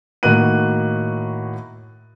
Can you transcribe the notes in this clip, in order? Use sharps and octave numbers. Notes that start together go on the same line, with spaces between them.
A2 D#3 A#3 F#4 F#6 D#7